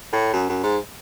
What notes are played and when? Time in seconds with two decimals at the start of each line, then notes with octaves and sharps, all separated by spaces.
0.13 A2
0.33 F#2
0.49 F#2
0.63 G#2